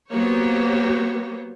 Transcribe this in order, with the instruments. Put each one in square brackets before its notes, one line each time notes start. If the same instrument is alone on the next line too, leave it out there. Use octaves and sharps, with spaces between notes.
[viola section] F#3 A#3 B3 G4 C5 C#5